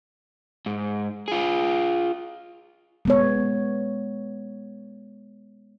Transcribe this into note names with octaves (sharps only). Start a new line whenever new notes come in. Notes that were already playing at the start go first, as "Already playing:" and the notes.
G#2
F4 G#4
G#3 B3 C#5